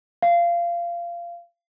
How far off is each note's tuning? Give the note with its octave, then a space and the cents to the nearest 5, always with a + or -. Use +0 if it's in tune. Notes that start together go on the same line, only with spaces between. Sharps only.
F5 -20